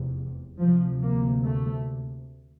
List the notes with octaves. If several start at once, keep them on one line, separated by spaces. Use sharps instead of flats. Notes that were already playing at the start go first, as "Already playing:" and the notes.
Already playing: F1 E2 C3
D2 C3 F3
A#3
A3